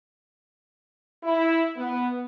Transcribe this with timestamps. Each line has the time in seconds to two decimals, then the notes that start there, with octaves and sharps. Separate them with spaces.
1.24 E4
1.77 B3